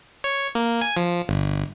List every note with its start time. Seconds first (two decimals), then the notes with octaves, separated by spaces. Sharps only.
0.24 C#5
0.55 A#3
0.81 G#5
0.97 F3
1.29 G1